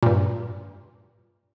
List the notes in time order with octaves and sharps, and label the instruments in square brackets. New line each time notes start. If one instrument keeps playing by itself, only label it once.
[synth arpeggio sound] G2 A#2